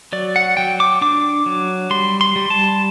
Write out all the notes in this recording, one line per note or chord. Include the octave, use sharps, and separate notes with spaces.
F#3 D5
F#5
F#3 G5
D6
D4 D6
F#3
G3 C6
C6
G3
A5